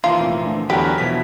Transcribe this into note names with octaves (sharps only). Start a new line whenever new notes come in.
D#2 E3 F3 A#3 F4
F1 A#2
D2
E2 D3 F#3 G4 A#4 B4
B2 E3 F3 B6